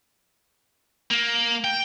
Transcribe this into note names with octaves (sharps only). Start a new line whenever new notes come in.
A#3
G5